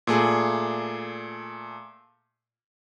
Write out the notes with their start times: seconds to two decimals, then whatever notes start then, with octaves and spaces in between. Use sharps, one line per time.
0.07 A#2 A3 G#4